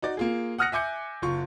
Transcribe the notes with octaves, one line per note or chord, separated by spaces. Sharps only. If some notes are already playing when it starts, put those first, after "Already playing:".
D#4 F#4 D5
A#3 F4 G#4
F#5 D#6 F6 F#6 A#6 C#7
E5 G#5 D6 G6 C#7
F#1 F4 C#6